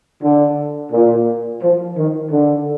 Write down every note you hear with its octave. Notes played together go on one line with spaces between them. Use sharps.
D3
A#2
F3
D#3
D3